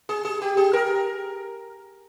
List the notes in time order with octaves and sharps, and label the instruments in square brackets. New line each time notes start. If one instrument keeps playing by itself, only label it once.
[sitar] G#4
G#4
G4
G#4
A#4